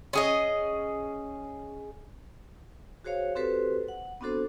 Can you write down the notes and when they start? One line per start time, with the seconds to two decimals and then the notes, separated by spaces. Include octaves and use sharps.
0.13 C#4 G#4 D#5
3.04 F#4 G#4 C5 C#5 F5
3.35 C4 F#4 G4 A4 B4 C5
3.88 F#5
4.21 B3 C4 D4 F#4 A4 C5